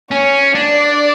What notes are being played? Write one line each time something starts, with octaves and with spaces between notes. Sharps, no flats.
C#4 C#5
D4 D5